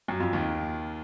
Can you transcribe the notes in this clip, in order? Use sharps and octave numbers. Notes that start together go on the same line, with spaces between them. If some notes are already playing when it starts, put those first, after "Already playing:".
F#2 F#3
F2 F3
D#2 D#3